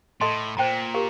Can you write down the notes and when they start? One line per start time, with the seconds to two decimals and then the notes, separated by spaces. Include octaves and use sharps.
0.21 A2 A4 D#5 A5 C6
0.57 A#2 C5 G5 A#5
0.94 G4 A#4 F5